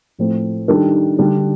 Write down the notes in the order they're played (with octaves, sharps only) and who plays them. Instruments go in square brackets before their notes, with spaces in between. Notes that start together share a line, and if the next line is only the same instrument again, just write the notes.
[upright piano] A2 F3 A3 C4
D#3 G3 D4 A4
D3 G3 D4